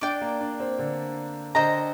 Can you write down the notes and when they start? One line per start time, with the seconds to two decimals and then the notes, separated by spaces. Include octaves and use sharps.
0.01 D4 D5 G5 D6
0.21 A#3
0.41 D4
0.60 C4
0.79 D3
1.55 D3 G4 C5 D#5 A#5